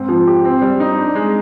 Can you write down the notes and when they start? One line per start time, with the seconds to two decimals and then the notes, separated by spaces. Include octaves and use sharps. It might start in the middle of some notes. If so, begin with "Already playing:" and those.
Already playing: G#2 C4
0.09 F3
0.27 G4
0.45 C4
0.62 G3
0.80 D#4
0.98 D4
1.15 G#3